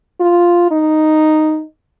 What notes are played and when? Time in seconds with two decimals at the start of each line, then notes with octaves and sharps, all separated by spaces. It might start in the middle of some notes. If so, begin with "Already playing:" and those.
0.20 F4
0.71 D#4